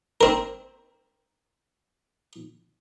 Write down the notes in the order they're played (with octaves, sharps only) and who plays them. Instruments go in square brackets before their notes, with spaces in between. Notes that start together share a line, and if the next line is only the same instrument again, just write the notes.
[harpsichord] C4 A#4